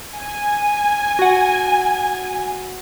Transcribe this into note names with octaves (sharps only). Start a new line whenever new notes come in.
G#5
F#4 F#5